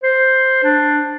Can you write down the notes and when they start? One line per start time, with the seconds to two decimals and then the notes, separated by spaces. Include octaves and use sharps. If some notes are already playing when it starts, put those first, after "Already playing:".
0.03 C5
0.64 D4